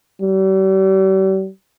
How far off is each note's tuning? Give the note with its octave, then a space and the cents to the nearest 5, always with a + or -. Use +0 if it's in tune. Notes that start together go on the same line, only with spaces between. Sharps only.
G3 -40